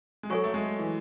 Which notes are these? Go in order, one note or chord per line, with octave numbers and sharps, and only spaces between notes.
G#3
F#3 A4 C#5 G#5 C#6
A3
G#3
E3